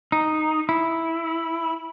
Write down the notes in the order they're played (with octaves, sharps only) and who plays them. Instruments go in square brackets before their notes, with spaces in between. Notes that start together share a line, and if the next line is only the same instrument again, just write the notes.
[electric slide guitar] D#4
E4